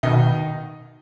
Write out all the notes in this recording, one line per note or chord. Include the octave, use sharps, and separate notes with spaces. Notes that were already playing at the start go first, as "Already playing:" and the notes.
B2 D#3 D#4